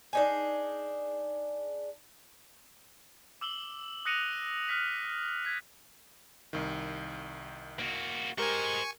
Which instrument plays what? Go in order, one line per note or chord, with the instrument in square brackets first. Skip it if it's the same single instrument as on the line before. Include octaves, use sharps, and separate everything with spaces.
[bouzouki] D4 D#4 G#4
[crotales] D6 E6 F#7 G7
D#6 F#6 A#6 C#7 D#7 F7
F6 F#6 B6
G6 G#6 B6
[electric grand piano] C2 D#3
[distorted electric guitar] A#3 F#4
[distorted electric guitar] G#3 C5 [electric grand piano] G4 A#4 [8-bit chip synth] G#5 C#6